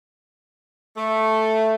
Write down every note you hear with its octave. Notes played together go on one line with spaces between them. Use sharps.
A3